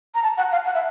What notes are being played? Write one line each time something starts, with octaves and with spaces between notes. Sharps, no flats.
A#5
A5
F#5
F5
F#5
E5